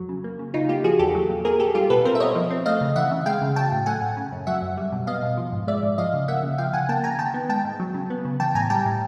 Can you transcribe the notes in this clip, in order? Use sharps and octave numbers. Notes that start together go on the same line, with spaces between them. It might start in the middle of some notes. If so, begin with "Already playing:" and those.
Already playing: F2 F#3
C#3
A#3
C#3
C#3 D#4 F4
A#3 F4 G4
F3 F#4 G#4
E2 G4 A4
F#3
A#2
A#3 G#4 A#4
A#2 G4 A4
G3 F4 G4
B2 A4 B4
C4 A#4 C5
E5
B2 C#5 D#5
F3
C4
A3 D#5 F5
C#3
E3 E5 F#5
C#3
G#3 F5 G5
C#3
F#3 G5 A5
A2
A3 F#5 G#5
A2
C#3
F#2
F#3 E5 F#5
F#2
G3
B2
B3 D#5 F5
B2
F3
G#2
G#3 D5 E5
G#2
F3 D#5 F5
C#3
A#3 E5 F#5
C#3
F3 F5 G5
C#3 F#5 G#5
A#3 G5 A5
C#3 G#5 A#5
D#3 G5 A5
B3
G#3 G5 A5
G#2
F#3
C#3
B3
C#3
E3 G5 A5
A2 G#5 A#5
G3 G5 A5
A2